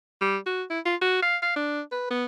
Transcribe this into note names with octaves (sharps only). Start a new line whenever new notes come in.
G3
F#4
E4
F4
F#4
F5
F5
D4
B4
B3